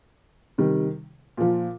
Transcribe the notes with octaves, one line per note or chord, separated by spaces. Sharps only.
C3 D#3 G3
A#2 F3